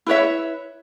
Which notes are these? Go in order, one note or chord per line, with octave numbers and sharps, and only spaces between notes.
E4 B4 C#5 E5